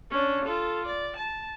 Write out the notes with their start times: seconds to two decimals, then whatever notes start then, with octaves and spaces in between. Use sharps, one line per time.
0.11 C#4 D4
0.45 F4 A4
0.86 D5
1.16 A5